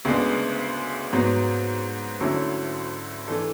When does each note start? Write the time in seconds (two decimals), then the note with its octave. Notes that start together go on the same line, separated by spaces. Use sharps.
0.05 D2 C#3 G#3 B3 D4
1.13 G#2 F#3 B3
2.21 D2 D3 F#3 C#4 E4
3.28 E3 A3 D4 A4